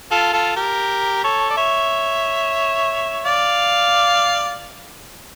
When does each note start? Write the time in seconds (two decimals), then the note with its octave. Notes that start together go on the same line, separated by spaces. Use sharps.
0.11 F4 A4
0.33 F4 A4
0.56 G4 A#4
1.24 A4 C#5
1.50 D5
1.57 C#5 E5
3.26 D5 F5